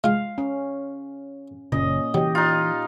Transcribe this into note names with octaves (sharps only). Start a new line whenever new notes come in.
G#3 F4 F5
C#4
F#1 A#2 C#3 C#4 D#5
E3 F#3 G4 D#5
D#4 F4